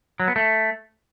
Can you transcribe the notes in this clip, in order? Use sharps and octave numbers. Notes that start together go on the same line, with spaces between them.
F#3
B3
A3